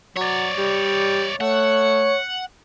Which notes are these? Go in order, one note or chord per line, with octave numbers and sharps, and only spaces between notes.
F#3 C#5 D5
G3
A3 C#5 F#5